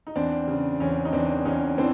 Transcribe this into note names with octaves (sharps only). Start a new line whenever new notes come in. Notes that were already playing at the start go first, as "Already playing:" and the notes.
D#4
E2 C4 D4
C#3
E2 C#4
D#4
E2 C4 D4
E2 C#4 D#4
E3 C4 D4